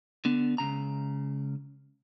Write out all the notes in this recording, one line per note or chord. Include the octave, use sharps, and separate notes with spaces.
D3 B3
C#2 G2 C#3 A#5